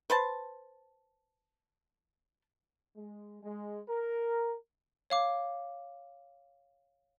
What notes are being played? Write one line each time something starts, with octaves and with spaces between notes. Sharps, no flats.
B4 C5 A5
G#3
G#3
A#4
C#5 F5 D6